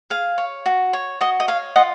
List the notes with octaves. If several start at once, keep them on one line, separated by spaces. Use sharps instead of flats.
G#4 F5
C#5
F#4
C#5
F#4 D#5
D#5
C#5 F5
F4 D#5 F#5